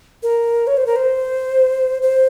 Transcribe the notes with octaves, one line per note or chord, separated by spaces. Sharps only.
A#4
C#5
C5
A#4
C5
C5